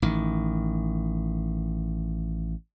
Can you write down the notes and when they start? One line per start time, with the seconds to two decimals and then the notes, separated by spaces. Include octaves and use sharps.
0.02 A1 D#3